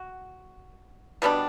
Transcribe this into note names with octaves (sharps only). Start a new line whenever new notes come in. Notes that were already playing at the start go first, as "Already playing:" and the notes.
Already playing: F#4
B2 G3 B3 D4